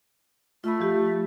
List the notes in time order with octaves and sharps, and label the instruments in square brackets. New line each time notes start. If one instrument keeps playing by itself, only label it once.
[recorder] A3 [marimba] F4 B5
[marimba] F3 F4 G4